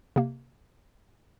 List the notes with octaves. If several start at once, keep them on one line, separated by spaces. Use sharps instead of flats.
C3 A#3